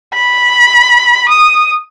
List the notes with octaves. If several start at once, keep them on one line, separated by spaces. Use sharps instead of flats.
B5
D#6